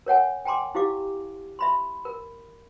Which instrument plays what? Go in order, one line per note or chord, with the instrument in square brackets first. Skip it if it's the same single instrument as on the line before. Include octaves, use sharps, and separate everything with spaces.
[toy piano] A#4 C#5 F#5 G#5
G5 G#5 A#5 C6 D6
E4 G4 F5 D6
E5 B5 C6
A#4